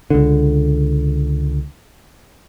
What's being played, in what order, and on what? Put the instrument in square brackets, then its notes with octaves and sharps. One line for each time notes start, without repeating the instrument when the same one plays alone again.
[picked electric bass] C#2 D3